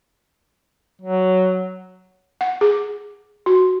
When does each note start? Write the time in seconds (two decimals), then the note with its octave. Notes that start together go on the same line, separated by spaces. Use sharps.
1.02 F#3
2.41 F#5
2.61 G#4
3.46 F#4